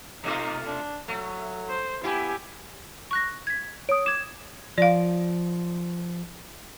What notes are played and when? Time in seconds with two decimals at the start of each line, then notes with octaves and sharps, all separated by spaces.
0.24 B2 A3 D#4 F4
0.67 D4
1.08 F#3 A3
1.69 C5
2.04 B3 E4 G4 G#5
3.11 C#6 F#6 A#6
3.47 G#6 B6
3.89 C#5 D#6 D7
4.06 D6 G#6 E7
4.78 F3 D5 F5